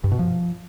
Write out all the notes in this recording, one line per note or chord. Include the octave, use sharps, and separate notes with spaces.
G2
B2
F3